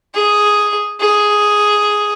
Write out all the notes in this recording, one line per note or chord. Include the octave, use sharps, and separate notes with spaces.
G#4
G#4